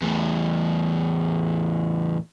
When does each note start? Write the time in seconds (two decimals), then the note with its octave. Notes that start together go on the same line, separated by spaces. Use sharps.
0.02 E2 A2